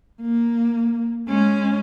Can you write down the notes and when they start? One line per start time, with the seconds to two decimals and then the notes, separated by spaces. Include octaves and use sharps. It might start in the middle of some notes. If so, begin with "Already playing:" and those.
0.21 A#3
1.29 G#3 C#4